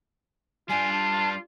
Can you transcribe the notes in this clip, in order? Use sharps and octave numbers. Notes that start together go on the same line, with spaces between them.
G3 D4 F4 G#5
A5